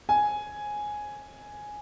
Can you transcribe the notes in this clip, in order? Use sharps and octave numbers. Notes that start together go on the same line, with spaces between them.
G#5